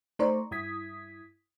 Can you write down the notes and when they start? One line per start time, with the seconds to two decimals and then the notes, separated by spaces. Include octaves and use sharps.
0.19 A3 D#4 C5 D5 A#5 C#6
0.51 G2 E4 D#6 G#6 B6